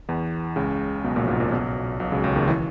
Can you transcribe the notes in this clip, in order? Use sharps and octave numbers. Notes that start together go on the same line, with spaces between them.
E2 E3
C#2 C#3
B1 B2
A#1 A#2
G#2
A#1 A#2
B1 B2
B1 B2
C#2 C#3
C#2 C#3
D#2 D#3
E3